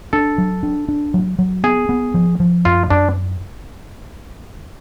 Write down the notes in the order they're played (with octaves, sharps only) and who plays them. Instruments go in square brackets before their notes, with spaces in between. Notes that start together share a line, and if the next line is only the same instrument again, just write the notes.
[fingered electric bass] D4 [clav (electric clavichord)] A4
[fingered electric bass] F#3
D4
D4
F#3
F#3
[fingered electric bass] B3 [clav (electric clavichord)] G#4
[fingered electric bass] B3
F3
F3
[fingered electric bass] F#2 [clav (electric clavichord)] F4
[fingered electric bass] F#2 [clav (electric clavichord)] D4